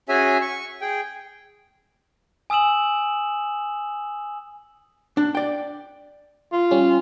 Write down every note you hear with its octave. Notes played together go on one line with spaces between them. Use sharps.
C#4 F#4 G#4 C#5 E5 G#5
C#6
G#4 G5
G#5 D#6 E6 E7 F#7
D4
D5 G5
F4
G3 C#4 G4